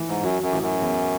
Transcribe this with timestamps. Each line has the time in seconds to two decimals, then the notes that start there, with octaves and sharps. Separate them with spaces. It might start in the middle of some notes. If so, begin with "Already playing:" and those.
Already playing: E3
0.08 G#2
0.23 F#2 F#3
0.42 F#2
0.53 A1
0.62 F#2
0.81 E2